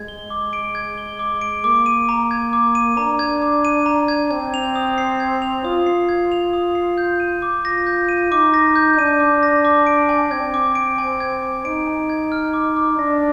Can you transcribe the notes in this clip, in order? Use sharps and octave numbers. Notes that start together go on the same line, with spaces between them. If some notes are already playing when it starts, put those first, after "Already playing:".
Already playing: G#3 G#6
G7
D6
D7
G#6
G7
D6
D7
A#3 D6
D#7
A#5
G#6
D6
D#7
D4 A#5
G#6
D6
D#7
A#5
G#6
C4 G#6
F7
D#6
C7
G#6
F7
F4 D#6
C7
G#6
F7
D#6
C7
G6
D#7
D6
F4 A#6
G6
D#7
D#4 D6
A#6
G6
D4 D#7
D6
A#6
D6
D7
G#5
C4 G#6
D6
D7
G#5
G#6
D6
D#4 D7
G#5
G#6
F6
D6
D6
D4 A#6